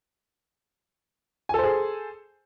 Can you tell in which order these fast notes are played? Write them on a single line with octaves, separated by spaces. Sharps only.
G#5 A4 C5 G#4